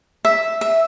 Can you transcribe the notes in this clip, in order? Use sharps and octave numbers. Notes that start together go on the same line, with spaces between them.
E5
E5